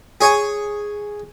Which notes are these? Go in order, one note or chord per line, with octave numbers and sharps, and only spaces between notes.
G#4 C#5 G#5